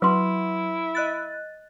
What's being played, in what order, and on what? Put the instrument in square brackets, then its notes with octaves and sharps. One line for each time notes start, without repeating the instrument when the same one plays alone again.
[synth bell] F#3 [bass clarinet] E4 [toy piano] B4 C6
[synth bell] D#5 F#6 A6